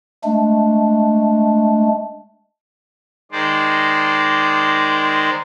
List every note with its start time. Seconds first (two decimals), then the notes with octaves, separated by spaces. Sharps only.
0.24 G#3 A3 D4
3.32 D#3 G#3 C5 D5